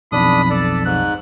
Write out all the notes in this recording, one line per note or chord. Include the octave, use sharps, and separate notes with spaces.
B1 F2 D4 B5 D#6
A4 D5
G#2 F#6